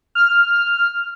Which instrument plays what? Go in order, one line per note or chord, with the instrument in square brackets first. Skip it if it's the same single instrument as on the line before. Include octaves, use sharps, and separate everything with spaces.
[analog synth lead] F6